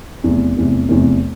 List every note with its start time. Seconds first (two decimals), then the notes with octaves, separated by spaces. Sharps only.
0.24 F1 E2 C3
0.57 F1 E2 C3
0.89 F1 E2 C3